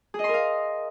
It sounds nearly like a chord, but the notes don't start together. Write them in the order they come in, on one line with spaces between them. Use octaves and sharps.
G#4 D#5 C6 A#4 F5